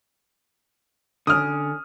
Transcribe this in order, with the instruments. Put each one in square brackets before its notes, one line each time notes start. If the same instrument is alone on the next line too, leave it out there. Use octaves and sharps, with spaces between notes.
[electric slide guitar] D3 C#4 [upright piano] D#6 F6